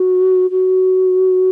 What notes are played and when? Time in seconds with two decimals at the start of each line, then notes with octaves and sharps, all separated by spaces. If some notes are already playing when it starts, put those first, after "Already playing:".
Already playing: F#4
0.50 F#4